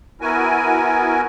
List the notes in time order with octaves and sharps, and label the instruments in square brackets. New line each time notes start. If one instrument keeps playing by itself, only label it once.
[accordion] B3 E4 F#4 A#4 G#5